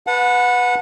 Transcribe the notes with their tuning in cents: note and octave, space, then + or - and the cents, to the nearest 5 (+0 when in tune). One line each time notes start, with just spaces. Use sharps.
B4 +0 F#5 -25 A5 +5